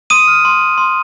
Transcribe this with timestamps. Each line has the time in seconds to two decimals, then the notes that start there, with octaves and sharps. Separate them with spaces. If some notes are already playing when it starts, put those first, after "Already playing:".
0.10 C6 D#6 D#7
0.28 F6
0.45 C6
0.61 C6
0.78 C6